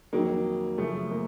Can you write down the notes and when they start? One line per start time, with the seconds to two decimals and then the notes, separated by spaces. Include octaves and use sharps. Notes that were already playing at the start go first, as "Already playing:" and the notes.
0.13 F2 D#3 F#3 A#3
0.78 F#2 C#3 F3 A3
1.11 A#3